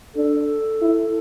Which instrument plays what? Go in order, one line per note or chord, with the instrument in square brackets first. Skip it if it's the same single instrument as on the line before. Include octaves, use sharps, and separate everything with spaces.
[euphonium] D4 [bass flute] A4
[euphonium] E4